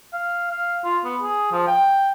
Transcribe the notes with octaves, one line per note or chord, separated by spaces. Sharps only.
F5
F5
F4
B3
G#4
F3
G5